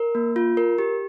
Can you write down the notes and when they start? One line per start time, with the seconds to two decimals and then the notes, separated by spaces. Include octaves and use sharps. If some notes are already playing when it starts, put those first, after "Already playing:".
Already playing: A#4
0.15 A#3
0.36 F4
0.57 A#4
0.78 G4